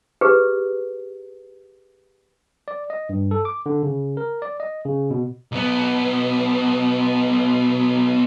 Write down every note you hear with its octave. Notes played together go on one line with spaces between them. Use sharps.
G4 G#4 B4
D5
D#5
G2
A4
D6
D3
C#3
A#4
D5
D#5
C#3
B2
B1 B3